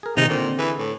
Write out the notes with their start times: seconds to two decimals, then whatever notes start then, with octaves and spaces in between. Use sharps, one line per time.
0.03 G#4 A#4
0.17 C3 D#3 G#3 D#4
0.29 A#2 D3 C4
0.58 E3 G#4 B4
0.79 A2